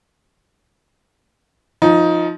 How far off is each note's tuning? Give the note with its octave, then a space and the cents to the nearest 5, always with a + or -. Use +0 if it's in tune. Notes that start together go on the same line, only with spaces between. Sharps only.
F3 +0 D#4 +15